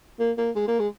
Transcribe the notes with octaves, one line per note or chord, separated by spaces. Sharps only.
A#3
A#3
G#3
A#3
G#3